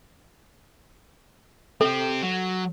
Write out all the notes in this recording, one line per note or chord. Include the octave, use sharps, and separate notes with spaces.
C4 G4 A4
F#3